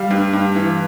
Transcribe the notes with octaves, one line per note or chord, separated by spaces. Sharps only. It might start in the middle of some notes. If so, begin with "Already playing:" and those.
Already playing: G3 F5
G2
G2
E3